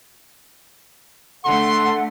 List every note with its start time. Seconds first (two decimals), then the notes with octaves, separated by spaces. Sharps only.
1.44 D3 A3 A4 F#5 C6